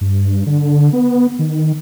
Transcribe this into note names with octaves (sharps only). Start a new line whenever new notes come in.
G2
D3
B3
D#3